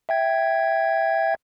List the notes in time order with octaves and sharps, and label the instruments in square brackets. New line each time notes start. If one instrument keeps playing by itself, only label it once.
[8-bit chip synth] E5 G5 G#6